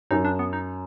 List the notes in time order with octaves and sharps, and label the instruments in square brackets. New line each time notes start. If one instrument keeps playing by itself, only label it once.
[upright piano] F#2 [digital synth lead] D#4
[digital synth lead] D4
B3
D#4